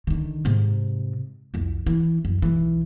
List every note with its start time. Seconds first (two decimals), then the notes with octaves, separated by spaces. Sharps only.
0.07 D3 D#3
0.45 G#2 C3
1.54 C2 F2
1.86 E3
2.25 F#2
2.42 B1 E3